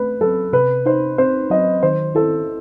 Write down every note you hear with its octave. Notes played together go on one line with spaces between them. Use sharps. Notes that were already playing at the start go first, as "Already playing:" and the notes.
Already playing: A3 B4
F#3 A4
C3 B4
D#4 C5
C4 C5
F#3 D#5
D#3 C5
E4 A4